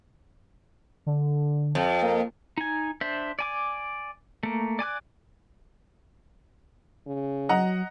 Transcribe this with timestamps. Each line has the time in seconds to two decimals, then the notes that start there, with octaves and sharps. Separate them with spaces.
1.06 D3
1.75 F2
2.02 A#3
2.58 D#4 G#5
3.01 D4 C5 E5
3.39 D5 G#5 D6
4.43 A3 A#3
4.79 D5 G#5 D6 F#6
7.07 C#3
7.49 F#3 D#5 F#5 A#5